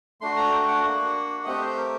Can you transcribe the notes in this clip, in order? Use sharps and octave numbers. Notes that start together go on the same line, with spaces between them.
A3 D4 F#4 C6
A#5
G5
F#5
A#3 D4 F#4
A3 C4 G4 D#5
C5
A#4